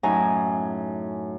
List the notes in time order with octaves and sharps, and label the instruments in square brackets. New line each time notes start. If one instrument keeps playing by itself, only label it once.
[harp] F#2 A2 C#4 D#4 G#5 A#5